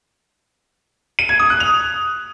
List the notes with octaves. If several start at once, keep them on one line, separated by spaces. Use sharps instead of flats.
D#7
G#6
D#6
F#6
F7